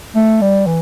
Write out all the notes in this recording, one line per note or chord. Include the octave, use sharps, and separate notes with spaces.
A3
G3
E3